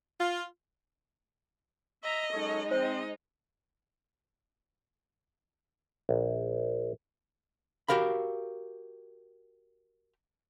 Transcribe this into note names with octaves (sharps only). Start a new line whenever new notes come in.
F4
D#5 E5 A#5
F#2 G#3 D#4 A4 C#5
C4 C5 D#5
A#1
F#4 G4 A#4 F5 B5